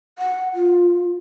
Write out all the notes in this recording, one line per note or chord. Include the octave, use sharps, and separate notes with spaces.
F#5
F4